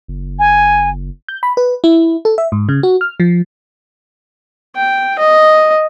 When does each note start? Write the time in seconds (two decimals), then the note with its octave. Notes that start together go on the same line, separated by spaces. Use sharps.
0.08 F#1
0.39 G#5
1.29 G6
1.43 B5
1.57 B4
1.84 E4
2.25 A4
2.38 E5
2.52 G#2
2.69 C#3
2.83 F#4
3.01 F6
3.20 F3
4.76 G5
5.19 D#5